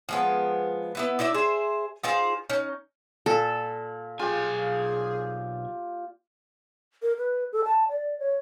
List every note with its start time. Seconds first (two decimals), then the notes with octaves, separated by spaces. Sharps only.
0.09 F3 G#3 B3
0.95 B3 E4 B4
1.19 D#4 E4 D5 E5
1.34 G#4 C5 E5
2.03 D#4 F4 G#4 C5
2.50 C#4 D#4
3.26 A#2 A4
4.19 B1 F4 G4 G#4 G#5
7.02 A#4
7.18 B4
7.52 A4
7.65 A5
7.89 D5
8.19 C#5